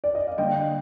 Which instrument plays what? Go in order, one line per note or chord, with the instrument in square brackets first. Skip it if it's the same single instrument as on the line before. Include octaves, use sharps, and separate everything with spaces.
[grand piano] D5
D#5
F5
[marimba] D3 G3 A#3 D4 [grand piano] D#5 G5